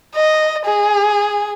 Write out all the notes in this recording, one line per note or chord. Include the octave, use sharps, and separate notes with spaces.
D#5
G#4